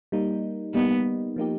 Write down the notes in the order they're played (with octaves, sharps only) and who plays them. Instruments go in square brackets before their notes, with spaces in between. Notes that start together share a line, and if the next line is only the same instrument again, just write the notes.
[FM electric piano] G3 A#3 D#4
[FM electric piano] G3 A#3 D#4 [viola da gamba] B3
[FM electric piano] F3 A#3 D#4 G4